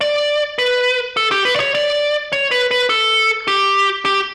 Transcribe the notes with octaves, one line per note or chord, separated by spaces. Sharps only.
D5
B4
A4
G4
B4
D5
C#5
D5
C#5
B4
B4
A4
G4
G4